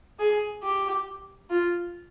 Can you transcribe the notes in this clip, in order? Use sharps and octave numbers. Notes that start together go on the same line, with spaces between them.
G#4
G4
F4